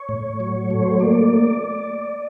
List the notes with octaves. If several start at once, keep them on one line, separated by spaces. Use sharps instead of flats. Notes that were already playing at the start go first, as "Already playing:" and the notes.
Already playing: C#5
A2
F#3
A3
C5
C#5
A#3 D5